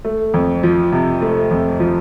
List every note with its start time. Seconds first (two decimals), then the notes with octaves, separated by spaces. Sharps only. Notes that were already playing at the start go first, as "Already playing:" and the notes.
0.05 A3
0.34 F2
0.63 F3
0.92 C3
1.22 A3
1.51 F2
1.80 F3